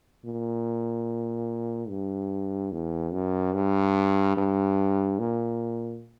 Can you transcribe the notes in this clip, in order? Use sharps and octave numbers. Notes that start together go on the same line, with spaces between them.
A#2
G2
E2
F#2
G2
G2
A#2